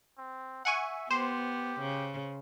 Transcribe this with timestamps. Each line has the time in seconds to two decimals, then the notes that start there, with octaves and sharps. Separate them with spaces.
0.18 C4
0.65 E5 F#5 G#5 C#6
1.10 B3 G4 C5
1.81 C#3